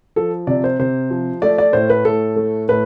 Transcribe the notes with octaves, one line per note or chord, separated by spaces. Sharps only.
F3 A4
C3 D5
C5
C3 C5
F3
A3 D5
D5
A2 C5
B4
A2 A4
A3
A2 B4